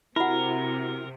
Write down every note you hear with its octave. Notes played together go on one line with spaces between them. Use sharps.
C3 E4 F#4 A#4 F#5 B5